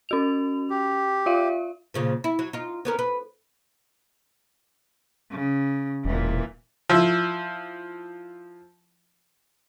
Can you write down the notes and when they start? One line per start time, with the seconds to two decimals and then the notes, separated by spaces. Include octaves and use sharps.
0.09 C#4 F#4 F7
0.70 G4
1.26 F4 E5 F5
1.94 A#2 C#3 F3
2.24 E4
2.39 F#3
2.53 D#4 F4
2.85 B3 C#4 A#4
2.99 B4
5.31 C#3
6.05 E1 A#2 E3
6.89 F3 E4